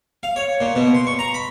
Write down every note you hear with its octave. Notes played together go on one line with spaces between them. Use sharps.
F5
C#5
A#2
B2
C6
C#6
A#5
B5